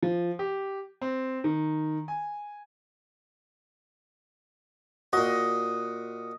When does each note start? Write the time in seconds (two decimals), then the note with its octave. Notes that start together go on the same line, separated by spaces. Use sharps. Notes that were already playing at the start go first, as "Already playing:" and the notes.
0.03 F3
0.39 G4
1.01 C4
1.44 D#3
2.08 G#5
5.13 A#2 F#4 D#5